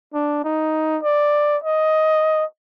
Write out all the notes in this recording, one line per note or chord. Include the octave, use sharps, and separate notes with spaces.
D4
D#4
D5
D#5